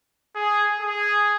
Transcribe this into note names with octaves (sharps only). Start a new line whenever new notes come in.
G#4
G#4